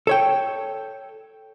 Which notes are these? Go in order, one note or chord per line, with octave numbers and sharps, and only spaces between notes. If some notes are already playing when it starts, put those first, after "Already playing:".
A4 C#5 G5